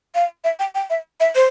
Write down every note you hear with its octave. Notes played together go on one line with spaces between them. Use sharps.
F5
E5
G5
G5
E5
E5
C5